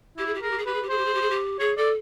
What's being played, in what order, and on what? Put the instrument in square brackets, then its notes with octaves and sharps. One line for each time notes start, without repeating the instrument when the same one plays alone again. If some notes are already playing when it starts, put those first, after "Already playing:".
[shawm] E4 [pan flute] G4
[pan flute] G#4
G4
[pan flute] G#4 [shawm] A#4
[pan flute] G4
G#4
[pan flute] G4 [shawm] B4
[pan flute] G#4
G4
[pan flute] G#4 [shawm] C5
[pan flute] G4
G#4
G4
G#4
G4
[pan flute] G#4 [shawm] C#5
[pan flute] A4 [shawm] D5